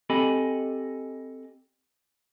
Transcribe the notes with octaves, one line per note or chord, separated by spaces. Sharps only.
C4 G4 A4 D#5 G#5 B5